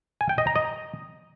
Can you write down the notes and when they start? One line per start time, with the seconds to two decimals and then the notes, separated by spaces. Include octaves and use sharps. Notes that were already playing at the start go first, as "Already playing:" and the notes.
0.21 G#5
0.29 G5
0.38 D#5
0.47 A#5
0.56 D#5